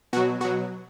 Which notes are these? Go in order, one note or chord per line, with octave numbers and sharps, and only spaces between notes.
B2 F#3 F#4
B2 F#3 F#4